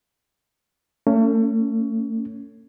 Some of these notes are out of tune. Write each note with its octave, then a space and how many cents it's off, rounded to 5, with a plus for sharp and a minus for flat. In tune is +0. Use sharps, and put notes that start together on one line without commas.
A3 +35 C#4 +15